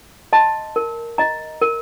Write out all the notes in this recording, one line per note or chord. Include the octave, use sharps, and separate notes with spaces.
D#5 A5 C6
A#4
D#5 A#5
A#4